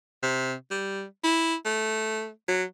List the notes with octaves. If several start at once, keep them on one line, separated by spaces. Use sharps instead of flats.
C3
G3
E4
A3
F#3